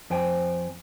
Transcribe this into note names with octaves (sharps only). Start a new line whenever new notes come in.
F2 C5 G5 G#5